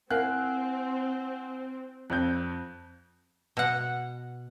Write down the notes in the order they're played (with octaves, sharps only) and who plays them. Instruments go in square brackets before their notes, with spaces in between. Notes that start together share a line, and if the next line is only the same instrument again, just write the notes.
[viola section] C4 [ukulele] E4 A#4 F5 [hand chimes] F#5 G#5 [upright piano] F#6
[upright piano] F2 C4 G6 [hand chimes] F#6
[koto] B2 F#5